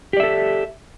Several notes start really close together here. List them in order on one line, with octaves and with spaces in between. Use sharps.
G4 D5 E5 A4